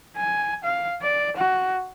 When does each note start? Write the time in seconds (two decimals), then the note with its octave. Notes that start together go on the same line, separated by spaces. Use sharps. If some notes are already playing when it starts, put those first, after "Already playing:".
0.17 G#5
0.65 F5
1.02 D5
1.37 F#4